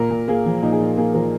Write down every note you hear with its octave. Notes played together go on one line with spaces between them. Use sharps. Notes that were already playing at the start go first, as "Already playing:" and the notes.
Already playing: A#2 A#4
A#2
A#3 G#4
F3
A#2 D#4
G#4
A#2 F4
A#3 G#4
F3 A#4